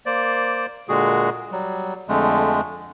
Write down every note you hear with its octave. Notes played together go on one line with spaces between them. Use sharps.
A#3 C5 D5
A#2 D3 G#3 F#4 G#4
F#3 G3
F2 D3 G#3 A3